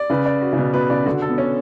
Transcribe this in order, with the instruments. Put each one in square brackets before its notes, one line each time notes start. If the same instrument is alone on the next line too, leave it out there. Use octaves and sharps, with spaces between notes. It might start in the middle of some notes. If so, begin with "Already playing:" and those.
Already playing: [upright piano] D5
[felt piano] C#3 [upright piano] B4
[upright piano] D5
F#4
[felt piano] C#3
[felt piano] B2 [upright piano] B3
[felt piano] B2 [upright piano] B4
[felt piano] C#3 [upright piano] D5
[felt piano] D3 [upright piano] F#4
[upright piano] A4
[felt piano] B3
[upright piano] C#4